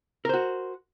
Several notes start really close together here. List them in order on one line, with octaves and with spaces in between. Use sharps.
A#4 C5 F#4